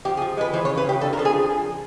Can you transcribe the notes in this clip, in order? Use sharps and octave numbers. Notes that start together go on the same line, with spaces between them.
F3 G4
G#4
F3
G#3 B4
E3 C5
C#5
C#3
B4
C#3 G4
D4 A4
A#4
F3 A4
G#4
F3